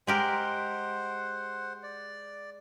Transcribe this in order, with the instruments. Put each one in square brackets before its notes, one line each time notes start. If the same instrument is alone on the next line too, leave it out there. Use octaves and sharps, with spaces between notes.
[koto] G#3 G4 A#4 [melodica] C5 F#5
[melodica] D5